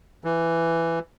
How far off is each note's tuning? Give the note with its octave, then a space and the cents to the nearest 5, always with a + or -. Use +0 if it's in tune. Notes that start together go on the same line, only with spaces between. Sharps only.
E3 +10